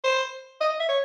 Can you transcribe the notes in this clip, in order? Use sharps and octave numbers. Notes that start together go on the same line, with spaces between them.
C5
D#5
E5
C#5